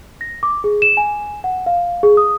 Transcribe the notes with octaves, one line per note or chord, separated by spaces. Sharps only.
A#6
D6
G#4
E7
G#5
F#5
F5
G#4
D#6